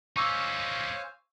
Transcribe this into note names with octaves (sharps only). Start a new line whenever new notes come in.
C#4 D#4 C5 F5 G#5 C#6 D6 E6